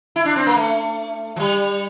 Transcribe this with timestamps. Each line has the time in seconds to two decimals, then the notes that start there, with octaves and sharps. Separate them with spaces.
0.16 E4
0.25 D4
0.36 C4
0.46 A#3
0.56 A3
1.36 F3
1.40 G3